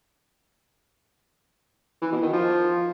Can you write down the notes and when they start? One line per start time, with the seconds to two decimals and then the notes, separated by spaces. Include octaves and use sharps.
2.02 E3
2.12 B2
2.22 D#3
2.33 F3